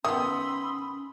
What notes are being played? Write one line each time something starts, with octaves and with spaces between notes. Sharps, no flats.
D#3 B3 C#4 B5 C6 D#6 E6